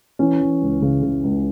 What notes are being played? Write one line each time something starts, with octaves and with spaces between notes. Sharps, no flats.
E3 C#4
E3
C#2
C#3
C#3
C#2